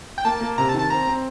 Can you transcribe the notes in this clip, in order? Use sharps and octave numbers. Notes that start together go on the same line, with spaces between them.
G5
A#3 A5
A#3
C3 A#5
A5
D#3
A5
C4 A#5
C4